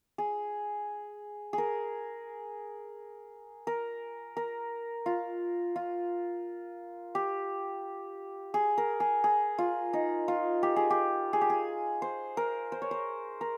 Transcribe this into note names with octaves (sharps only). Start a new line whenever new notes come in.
G#4
G#4 A#4
A#4
A#4
F4
F4
G4
G#4
A#4
G#4
G#4
F4
D#4
F4
G4
G#4
G4
G#4
G4
G#4
C5
A#4
C5
C#5
C5
A#4